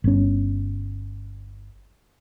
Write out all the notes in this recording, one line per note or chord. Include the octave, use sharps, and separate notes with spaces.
G1 C#4